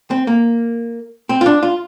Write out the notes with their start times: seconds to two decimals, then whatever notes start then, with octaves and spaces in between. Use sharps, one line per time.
0.11 C4
0.27 A#3
1.29 C4
1.41 F4
1.46 D4
1.63 F4